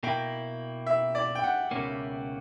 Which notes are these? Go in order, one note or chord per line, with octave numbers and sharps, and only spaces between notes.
B2 A#3 E4 G5
E5
D5
G5
F#5
C#2 B2 A#3 C#4